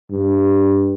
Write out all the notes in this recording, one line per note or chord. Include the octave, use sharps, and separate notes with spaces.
G2